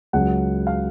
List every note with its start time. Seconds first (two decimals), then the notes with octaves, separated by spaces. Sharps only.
0.13 C#2 C#3 F#3 F#5
0.67 F5